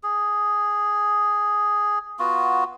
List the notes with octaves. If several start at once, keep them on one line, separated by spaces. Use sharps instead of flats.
G#4
B3 F4 F#4